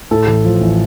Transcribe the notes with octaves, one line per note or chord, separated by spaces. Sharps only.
A2 A4
A1
F3
A1